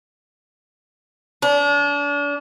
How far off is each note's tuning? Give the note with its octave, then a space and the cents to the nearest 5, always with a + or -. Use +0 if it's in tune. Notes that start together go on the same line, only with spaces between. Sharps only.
D4 -35